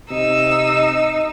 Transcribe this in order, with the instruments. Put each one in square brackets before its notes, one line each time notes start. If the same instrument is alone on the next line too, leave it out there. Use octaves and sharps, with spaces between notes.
[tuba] C3 [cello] D#4 [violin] E6